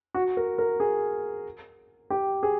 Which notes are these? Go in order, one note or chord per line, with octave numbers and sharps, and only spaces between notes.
F#4
A#4
A#4
G#4
G4
G#4